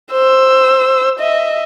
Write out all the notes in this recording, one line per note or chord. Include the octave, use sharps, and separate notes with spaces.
C5 E6
D#5 E5